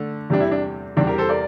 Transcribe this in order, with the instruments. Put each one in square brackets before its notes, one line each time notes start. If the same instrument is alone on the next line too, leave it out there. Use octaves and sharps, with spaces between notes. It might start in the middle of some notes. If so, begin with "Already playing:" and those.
Already playing: [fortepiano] D3 A3
[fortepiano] E2 C3 G3 [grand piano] D4
[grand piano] E4
D4
[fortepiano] E2 C3 G3 [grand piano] D4
[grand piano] G4 A#4
A4 C5
A#4 D5